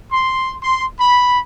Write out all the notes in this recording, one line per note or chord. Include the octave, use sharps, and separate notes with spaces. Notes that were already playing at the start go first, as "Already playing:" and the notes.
C6
C6
B5